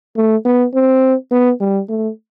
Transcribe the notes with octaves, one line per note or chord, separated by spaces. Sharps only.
A3
B3
C4
B3
G3
A3